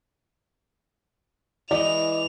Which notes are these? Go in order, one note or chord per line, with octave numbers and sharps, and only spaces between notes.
E3 G#3 D5 D#5 F7